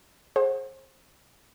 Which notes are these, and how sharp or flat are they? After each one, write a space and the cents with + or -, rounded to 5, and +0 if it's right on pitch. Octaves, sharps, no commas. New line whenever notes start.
G#4 +15 C5 +35 F#5 +0